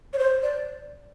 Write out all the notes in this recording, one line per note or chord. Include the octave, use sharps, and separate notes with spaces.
C#5
C5
D5